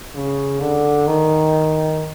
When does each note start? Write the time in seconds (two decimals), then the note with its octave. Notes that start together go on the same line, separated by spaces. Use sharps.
0.16 C#3
0.60 D3
1.07 D#3